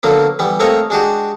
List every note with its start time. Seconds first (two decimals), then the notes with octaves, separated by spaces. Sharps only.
0.03 D3 F#3 A#3 B3
0.39 E3 G3 B3
0.60 A3 A#3 C4 C#5 D#5
0.90 G#3 D4 F#4 G4